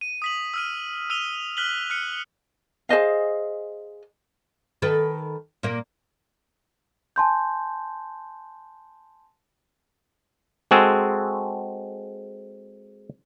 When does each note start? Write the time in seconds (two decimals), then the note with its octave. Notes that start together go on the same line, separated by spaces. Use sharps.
0.01 D#7
0.22 D#6 B6 F#7
0.54 E6 F6 D#7
1.10 E6 D#7 F7 G7
1.57 F6 F#6 B6 F#7 G7
1.90 F6 F#6 C#7
2.89 G#4 C5 D#5 F5
4.82 D#3 A4 B4
5.63 A#2 A#3
7.16 G#5 A5 C6 G6
10.71 G#3 C4 F#4 G#4 A4